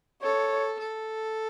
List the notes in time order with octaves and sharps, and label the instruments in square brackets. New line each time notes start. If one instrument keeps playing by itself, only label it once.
[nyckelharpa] A4 [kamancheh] C#5
[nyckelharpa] A4